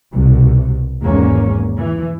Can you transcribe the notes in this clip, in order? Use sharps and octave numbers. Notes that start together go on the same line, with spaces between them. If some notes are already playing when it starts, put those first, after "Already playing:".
C2 B2
G#1 E2 G#2 A#3 C#4
E3